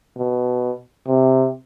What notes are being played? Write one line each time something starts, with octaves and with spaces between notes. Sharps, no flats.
B2
C3